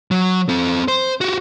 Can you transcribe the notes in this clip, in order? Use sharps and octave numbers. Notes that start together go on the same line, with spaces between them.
F#3
C4 A4
C5
F#4 G4